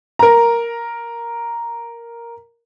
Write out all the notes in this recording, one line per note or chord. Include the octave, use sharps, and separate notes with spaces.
A#4 A#5